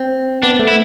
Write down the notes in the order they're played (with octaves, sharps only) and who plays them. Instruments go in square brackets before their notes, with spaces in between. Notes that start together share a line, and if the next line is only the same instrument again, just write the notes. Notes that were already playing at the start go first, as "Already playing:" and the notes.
Already playing: [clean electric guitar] C4
[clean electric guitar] B3 [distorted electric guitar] D4
[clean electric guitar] A3
[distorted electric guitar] E4